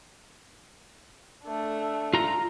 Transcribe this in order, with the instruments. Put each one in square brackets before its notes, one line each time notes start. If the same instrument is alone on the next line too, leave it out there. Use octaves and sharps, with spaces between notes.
[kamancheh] A3 D4
[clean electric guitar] F4 A#5